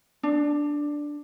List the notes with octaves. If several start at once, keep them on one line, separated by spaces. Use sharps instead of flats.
D4